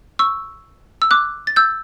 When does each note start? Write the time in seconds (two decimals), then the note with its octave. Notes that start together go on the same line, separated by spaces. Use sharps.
0.19 C#6 E6
1.02 E6
1.11 D6 F#6
1.47 A6
1.56 E6 G6